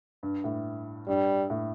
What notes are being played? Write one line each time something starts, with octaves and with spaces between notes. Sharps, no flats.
G2
A2
G2 G3
A2